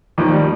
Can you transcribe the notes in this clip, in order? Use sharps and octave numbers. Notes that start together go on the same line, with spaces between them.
D#2 D#3 F3
G3